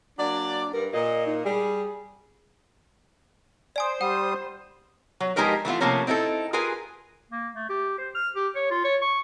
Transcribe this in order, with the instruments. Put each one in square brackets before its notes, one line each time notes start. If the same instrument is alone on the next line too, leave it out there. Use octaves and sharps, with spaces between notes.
[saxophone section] F#3 A#3 D5 [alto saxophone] D4
[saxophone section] G2 [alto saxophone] A#4
[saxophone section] A#2 [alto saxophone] D#5
[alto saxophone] D#4
[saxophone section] G3 [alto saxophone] G#4
[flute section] C5 [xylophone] D5 G#5 D#6
[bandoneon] G3 D#6 [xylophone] F#5
[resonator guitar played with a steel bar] F#3
F3 G#3 D#4 G4 A#4 B4
E3 A3 B3 F4
C3 D#3 F3 A3 A#3 C#4
C4 D#4 E4 F#4 A4
F4 G#4 A#4 B4 G#5
[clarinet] A#3
A3
G4
C5
F6
G4
C#5
F4
C#5
C#6